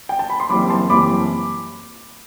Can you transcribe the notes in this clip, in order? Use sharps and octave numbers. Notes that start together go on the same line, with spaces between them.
G5
A5
B5
C6
F#1 F#2 E3 G3 C4 B5 D6
A5 C6
F#1 F#2 E3 G3 C4 B5 D6